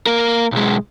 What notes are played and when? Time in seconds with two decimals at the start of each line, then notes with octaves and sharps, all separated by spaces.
0.06 A#3 A#4
0.52 B1 G#3